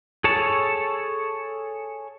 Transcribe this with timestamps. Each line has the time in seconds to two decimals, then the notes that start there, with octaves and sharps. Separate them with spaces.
0.24 G#4 A4 C#5 A5